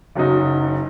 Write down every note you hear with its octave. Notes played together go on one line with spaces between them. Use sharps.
F#1 F#2 F#3 D#4